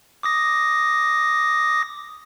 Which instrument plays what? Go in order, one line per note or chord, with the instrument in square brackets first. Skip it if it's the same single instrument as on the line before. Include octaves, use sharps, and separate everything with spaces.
[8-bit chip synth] D6 D#6 A#6